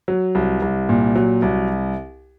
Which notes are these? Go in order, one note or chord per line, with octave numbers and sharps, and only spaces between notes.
F#3
C2
C2
A#2
F#3
C2